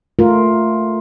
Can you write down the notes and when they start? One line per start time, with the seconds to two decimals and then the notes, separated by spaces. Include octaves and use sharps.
0.19 A3 F4 A#4